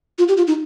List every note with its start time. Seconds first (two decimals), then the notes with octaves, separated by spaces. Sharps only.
0.19 F4
0.28 G4
0.37 F4
0.47 D#4